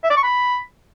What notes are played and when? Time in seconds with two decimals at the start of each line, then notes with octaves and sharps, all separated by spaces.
0.04 E5
0.10 D5
0.17 C#6
0.23 B5